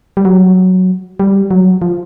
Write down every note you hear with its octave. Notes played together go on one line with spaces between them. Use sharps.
G3
F#3
G3
F#3
F3